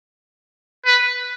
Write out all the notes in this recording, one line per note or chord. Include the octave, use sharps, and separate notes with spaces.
B4